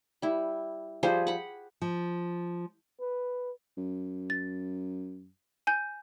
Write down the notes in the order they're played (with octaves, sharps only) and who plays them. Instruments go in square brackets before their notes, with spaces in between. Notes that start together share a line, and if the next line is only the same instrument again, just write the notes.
[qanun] G3 E4
F3 G3 G#4 C5
F#5 B5
[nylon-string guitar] F3
[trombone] B4
[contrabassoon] F#2
[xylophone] A6
G#5 G6